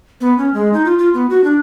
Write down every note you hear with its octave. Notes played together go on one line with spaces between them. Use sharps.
B3
C#4
G#3
D#4
F4
F4
B3
F#4
D4